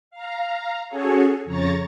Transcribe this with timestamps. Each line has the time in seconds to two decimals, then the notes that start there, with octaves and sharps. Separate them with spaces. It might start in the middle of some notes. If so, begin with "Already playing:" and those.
0.11 F5 A#5
0.88 C#4 F#4 G#4 A4 C#5
1.44 F2 C#3 C#5 A#5 C#6 A6